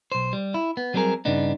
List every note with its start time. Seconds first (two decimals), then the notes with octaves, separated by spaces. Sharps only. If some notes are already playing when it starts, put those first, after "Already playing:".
0.12 B1 C5
0.33 G3
0.54 E4
0.77 B3
0.94 F#3 G3 C4 G#4 A#4
1.25 G2 C#3 B3 D4 D#4